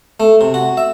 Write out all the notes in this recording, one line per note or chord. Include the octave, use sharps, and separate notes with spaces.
A3
C3
F#4
E5